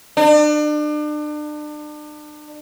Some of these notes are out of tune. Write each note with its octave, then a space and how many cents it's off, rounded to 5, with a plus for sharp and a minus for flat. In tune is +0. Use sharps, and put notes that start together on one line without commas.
D4 +35